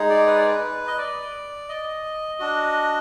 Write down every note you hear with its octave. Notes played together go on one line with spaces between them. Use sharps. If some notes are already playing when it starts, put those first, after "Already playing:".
Already playing: G#3 D#4 G#4
D5
B4
D5
B4
D#5
D5
D#5
D4 F#4